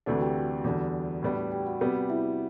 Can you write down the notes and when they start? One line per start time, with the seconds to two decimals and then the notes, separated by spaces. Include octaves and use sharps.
0.06 D2 C3 E3 A3 D4 F#4 F#5
0.21 G4 G5
0.64 E2 D3 G3 D4 F#4 F#5
1.22 A2 G3 B3 D4
1.52 G4 G5
1.66 F#4 F#5
1.80 C3 G3 B3 F#4 F#5
2.09 E4 E5